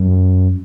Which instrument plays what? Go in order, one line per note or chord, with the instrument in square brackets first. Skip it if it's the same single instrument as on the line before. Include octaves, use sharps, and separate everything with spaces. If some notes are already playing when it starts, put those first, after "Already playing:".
Already playing: [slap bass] F#2